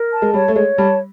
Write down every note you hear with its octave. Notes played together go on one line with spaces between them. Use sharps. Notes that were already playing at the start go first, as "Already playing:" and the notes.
Already playing: A#4
A5
G#3
G3 C#5
A3
G#3 C#5
G3 A5